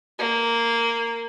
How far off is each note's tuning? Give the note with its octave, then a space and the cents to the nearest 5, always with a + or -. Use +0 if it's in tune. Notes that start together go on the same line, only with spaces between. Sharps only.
A#3 -10